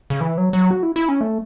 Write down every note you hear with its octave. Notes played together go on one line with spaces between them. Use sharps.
C#3
E3
F#3
F#3
F#4
E4
E4
C#4
A3